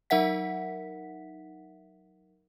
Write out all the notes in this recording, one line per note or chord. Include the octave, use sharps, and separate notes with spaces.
F#3 D#4 A#4 E5 F#5 B6